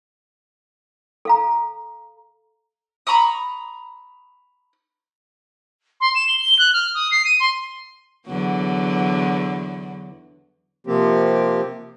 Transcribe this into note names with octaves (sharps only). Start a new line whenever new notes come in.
A4 F5 A#5
A#5 B5 C#6 D#6
C6
E7
G7
G7
F#6
F6
D#6
C7
D#7
C6
E2 D3 F#3
C3 F3 A#3 C4 G4